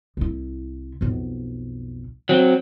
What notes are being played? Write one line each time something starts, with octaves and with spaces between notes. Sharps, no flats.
C2 E4
B1 F2
F#3 C4